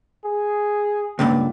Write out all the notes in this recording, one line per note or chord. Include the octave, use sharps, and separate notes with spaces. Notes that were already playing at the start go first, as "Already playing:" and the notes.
G#4
C#2 G2 A#2